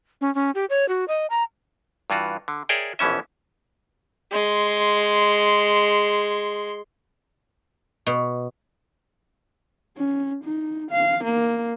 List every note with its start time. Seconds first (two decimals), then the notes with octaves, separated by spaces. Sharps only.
0.21 C#4
0.35 C#4
0.55 G4
0.70 C#5
0.89 F#4
1.08 D#5
1.30 A#5
2.10 G2 E3 F4 F#4
2.48 D3
2.69 G#4 A#4 C#5 D5 E5 G5
2.99 A#1 B2 E3 C#4 E5
4.32 G#3 C6
8.07 B2
9.98 C#4
10.44 D#4
10.91 F5
11.24 A#3